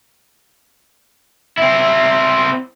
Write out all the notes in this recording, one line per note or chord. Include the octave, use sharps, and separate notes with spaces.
C4 E4